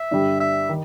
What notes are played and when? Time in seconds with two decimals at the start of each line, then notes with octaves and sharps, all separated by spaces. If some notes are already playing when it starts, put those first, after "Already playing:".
Already playing: E5
0.11 G2 D3 G3
0.40 E5
0.69 D#3